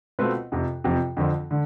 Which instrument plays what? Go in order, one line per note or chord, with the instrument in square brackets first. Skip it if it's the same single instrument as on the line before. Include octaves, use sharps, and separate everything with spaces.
[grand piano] B2 A3 C4 F4 B4
F2 C3 F3
F2 C3 F3
F2 D3 F3 C4
D3